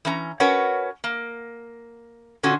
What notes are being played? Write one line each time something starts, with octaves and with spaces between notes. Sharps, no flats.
E3 C#4 A#5
C#4 F#4 A#4 B4 C#5 F#5
A#3
A#2 D3 C#4 F4 F#4